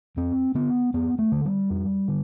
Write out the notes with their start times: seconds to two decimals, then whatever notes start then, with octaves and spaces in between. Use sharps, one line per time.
0.17 F2 C4
0.55 D3 B3
0.94 F2 B3
1.19 A3
1.32 D3
1.45 G3
1.70 F2
2.08 D3